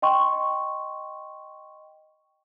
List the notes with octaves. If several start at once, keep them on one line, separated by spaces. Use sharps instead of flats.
D#5 G5 C6 C#6